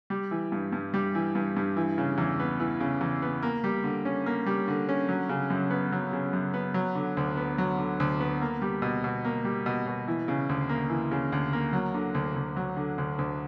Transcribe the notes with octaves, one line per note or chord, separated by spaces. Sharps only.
G3
E3
G2
G2
G3
E3
G2
G2
E3
C#3
E2
B3
E3
C#3
E2
B3
A#3
G3
D3
C#4
A#3
G3
D3
C#4
F#3
C#3
F#2
B3
F#3
C#3
F#2
B3
F#3
D3
D2
B3
F#3
D3
D2
B3
A#3
G3
B2
B2
A#3
G3
B2
B2
E3
C#3
D2
A#3
E3
C#3
D2
A#3
F#3
D3
D2
D2
F#3
D3
D2
D2